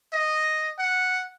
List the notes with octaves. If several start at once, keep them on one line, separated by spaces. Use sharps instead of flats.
D#5
F#5